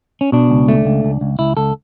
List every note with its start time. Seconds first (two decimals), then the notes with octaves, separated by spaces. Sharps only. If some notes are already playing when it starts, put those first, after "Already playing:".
0.21 C#4
0.32 B2 D4
0.50 C#2
0.68 A3
0.86 C#2
1.04 C#2
1.21 C#2
1.39 C#2 E4
1.57 C#2 A4